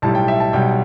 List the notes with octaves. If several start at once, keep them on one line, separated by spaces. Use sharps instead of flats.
B1 A2 G3 A5
G5
E5
A5
B1 B2 G3 G5